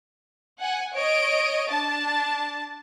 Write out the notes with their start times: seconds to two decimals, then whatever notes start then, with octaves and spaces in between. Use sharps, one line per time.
0.60 F#5 G#5
0.94 C#5 D#5 D7
1.70 D4 A5